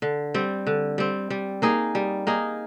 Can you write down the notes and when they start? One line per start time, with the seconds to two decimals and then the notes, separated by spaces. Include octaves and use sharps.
0.02 D3
0.34 G3 C4
0.67 D3
0.98 G3 C4
1.30 G3
1.62 A#3 D#4 G#4
1.95 G3
2.27 A#3 D#4 G#4